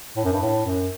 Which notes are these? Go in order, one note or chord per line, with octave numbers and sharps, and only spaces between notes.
A2
F#2
G2
A2
F#2